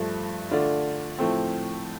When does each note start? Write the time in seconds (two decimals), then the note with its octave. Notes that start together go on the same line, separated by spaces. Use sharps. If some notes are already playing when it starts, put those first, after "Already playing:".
Already playing: G2 F3 A3
0.51 D3 A3 D4 F4
1.18 A2 F3 A3 C4